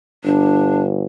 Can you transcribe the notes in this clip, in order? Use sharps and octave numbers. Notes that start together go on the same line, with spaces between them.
G1 D4